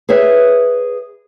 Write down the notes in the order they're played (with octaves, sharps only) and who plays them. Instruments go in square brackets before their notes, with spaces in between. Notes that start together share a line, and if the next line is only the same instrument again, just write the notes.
[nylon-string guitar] G#4 B4 C#5 E5